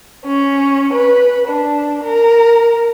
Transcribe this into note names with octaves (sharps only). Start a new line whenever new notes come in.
C#4
B4
D4
A#4